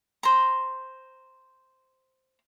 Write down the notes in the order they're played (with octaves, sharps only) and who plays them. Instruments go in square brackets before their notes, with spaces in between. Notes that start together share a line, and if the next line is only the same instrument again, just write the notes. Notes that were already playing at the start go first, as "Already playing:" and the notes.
[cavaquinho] C5 A#5